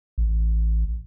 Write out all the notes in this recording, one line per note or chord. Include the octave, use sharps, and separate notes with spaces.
A1